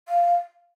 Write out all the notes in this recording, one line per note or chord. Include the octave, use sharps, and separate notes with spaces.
F5